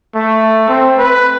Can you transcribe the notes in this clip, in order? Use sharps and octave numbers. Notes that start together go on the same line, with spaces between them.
A3
C4
B4